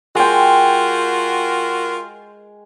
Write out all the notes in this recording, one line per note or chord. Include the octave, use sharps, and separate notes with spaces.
G#3 F4 F#4 A#4 G5